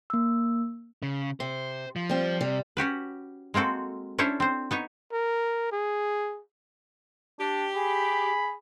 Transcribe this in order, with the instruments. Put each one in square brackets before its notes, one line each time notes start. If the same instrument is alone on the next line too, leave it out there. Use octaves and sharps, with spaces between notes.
[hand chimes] A#3 E6
[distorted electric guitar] C#3
[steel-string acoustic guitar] C3 [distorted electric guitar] C5
[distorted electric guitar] F3
[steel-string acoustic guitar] G3 C4
[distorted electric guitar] C3 [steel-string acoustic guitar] G3
[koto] C#4 F#4 G4 B4
G#3 A#3 C4 F#4 A4
C#4 D4 E4 A4 C5 C#5
C4 C5
B3 D#4 C#5
[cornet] A#4
G#4
[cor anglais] D4 [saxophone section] G4
[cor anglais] G#4 [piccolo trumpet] B5